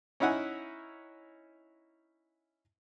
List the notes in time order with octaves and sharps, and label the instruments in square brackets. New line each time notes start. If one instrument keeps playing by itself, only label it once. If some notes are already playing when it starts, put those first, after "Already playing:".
[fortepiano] C#4 D#4 E4 F#5 G#5